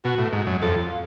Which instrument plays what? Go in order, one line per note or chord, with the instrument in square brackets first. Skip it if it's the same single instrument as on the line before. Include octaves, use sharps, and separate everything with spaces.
[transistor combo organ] B2 [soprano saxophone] F#4
[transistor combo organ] A2
G#2
F#2
[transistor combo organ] F2 [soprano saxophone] A4
[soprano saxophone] F4